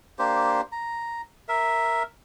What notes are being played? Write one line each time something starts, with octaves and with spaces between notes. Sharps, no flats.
A#3 D4 G4 C5
A#5
A#4 E5